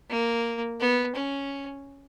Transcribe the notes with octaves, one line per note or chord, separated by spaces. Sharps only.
A#3
B3
C#4